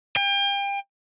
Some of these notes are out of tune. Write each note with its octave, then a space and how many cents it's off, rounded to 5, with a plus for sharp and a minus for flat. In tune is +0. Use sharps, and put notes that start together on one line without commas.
G5 +35